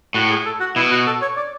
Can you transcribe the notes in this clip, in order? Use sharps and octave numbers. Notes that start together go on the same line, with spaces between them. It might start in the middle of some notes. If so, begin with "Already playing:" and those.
A2 F#4
G#4
A4
F#4
B2 E4
F#4
A4
C#5
D5